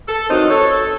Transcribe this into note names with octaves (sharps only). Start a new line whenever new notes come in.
A4
D#3 E3 F#3 C4 D#4
A4 C#5